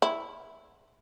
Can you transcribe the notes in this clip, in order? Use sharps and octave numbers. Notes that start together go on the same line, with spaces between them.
E4